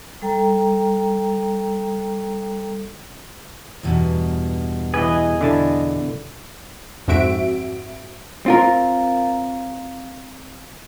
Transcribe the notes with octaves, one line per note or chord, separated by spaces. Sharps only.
G3 A4 G5 A#5
E2 G2 B2
E3 G#4 B4 D#5
D3 E4 A5
F2 G#2 C4 F#4 E5 D7
C4 F4 A#4